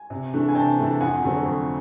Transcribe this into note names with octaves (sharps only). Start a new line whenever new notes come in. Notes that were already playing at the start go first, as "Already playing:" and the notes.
Already playing: G#5
C3
E3 A3 D4
G#5
C3 G5 A5
E3 A3 D4
F2 F#5 G#5
D3 F#3 A3 C4
F2